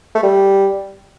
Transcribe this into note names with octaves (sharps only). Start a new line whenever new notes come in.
A3
G3